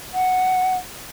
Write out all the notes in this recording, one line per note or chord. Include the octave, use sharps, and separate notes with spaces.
F#5